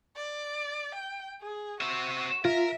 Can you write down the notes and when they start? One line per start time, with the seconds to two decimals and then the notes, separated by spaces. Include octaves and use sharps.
0.17 D5
0.95 G5
1.41 G#4
1.81 C4 F#4 E5
2.45 F4 A#4 E5